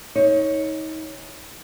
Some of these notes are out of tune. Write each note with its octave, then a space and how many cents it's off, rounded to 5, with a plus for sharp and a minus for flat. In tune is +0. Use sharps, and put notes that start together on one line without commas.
D#4 +30 C#5 +0